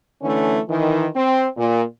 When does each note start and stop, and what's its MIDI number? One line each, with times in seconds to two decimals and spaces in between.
0.22 0.58 50
0.22 0.58 52
0.22 0.58 57
0.22 0.58 61
0.70 1.07 51
0.70 1.07 52
1.16 1.46 60
1.58 1.83 46